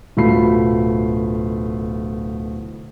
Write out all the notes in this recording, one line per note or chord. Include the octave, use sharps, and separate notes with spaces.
D1 B2 A3 F4 B5 C7